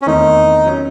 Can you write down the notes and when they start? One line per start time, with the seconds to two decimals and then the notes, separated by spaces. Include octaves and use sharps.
0.02 C#4
0.06 E2 D#3 A3 C4 D#4
0.66 F#3 C#4